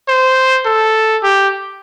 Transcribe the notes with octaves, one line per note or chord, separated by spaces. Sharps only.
C5
A4
G4